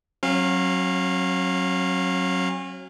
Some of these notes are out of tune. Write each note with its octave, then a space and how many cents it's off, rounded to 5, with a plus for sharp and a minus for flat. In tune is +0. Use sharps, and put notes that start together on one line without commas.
F#3 +0 C#4 -35 F5 +0